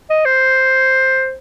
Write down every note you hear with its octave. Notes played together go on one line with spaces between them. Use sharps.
D#5
C5